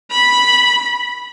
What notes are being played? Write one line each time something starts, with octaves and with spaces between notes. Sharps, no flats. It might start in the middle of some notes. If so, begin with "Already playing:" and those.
B5